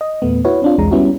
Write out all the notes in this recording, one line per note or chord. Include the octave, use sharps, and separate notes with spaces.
D#5
E2 A#2 A3 B3
E4 F#4 B4 C#5
C4 D4 F4
B1 E2 G#3 A#5
G3 B3 C#4 E4 F#4